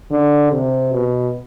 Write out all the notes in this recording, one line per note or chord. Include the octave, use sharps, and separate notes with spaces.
D3
C3
B2